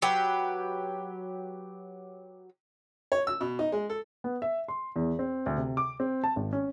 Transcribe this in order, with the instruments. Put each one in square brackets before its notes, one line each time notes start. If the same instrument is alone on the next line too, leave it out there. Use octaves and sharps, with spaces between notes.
[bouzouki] F#3 G4 B4
[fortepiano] C#5
E6
B2
D#4
G#3
A4
[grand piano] B3
E5
C6
E2
C4
D2
C3
D6
C4
A5
G#1
C#4